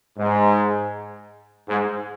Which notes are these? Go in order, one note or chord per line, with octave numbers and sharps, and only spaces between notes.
G#2
G#2